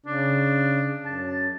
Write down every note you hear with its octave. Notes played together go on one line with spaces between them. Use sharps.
C#3 D4
F#2 A5